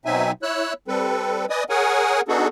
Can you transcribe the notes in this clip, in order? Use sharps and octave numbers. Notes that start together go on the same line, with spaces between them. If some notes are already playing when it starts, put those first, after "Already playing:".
B2 F#3 C4 D#4 E5 G#5
E4 C#5 E6 F#6
G3 C4 A4 B4
B4 D5 D#5 G#5 D#6
G#4 A#4 C#5 F#5 G#5
B3 D4 D#4 F#4 G#4 A4